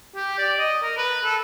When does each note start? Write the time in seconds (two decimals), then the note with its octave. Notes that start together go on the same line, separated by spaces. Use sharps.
0.15 G4
0.38 D5
0.58 D#5
0.83 A#4
0.97 B4
1.24 A4